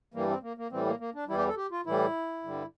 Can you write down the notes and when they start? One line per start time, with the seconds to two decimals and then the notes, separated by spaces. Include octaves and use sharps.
0.14 G2 E3 G3 A#3
0.28 C4
0.43 A#3
0.57 A#3
0.71 A2 E3 G3 C4
0.85 A#3
1.00 A#3
1.15 D4
1.28 E2 E3 G3 E4
1.38 G4
1.48 A4
1.57 G4
1.71 F4
1.86 A2 E3 G3 E4
2.43 G2 D3 G3